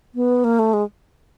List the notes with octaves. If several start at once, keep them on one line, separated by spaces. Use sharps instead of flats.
B3
A#3
A3
G#3